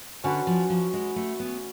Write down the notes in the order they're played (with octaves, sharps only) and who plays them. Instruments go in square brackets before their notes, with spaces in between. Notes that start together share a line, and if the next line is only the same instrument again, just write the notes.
[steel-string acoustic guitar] D3 [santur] C#4 F#4 B4
[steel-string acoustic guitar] F3
F3
G#3
A3
B3